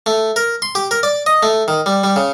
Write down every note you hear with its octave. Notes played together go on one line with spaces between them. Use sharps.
A3
A#4
C6
G4
A#4
D5
D#5
A3
D#3
G3
G3
C#3